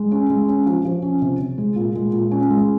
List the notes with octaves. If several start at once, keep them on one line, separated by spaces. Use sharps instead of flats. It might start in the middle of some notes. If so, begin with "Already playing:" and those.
Already playing: G#3
C#4
G#3
C#4
F3
F3
C#4
C3
C3
G#3
A#2
G#3
A#2
C#4
G#3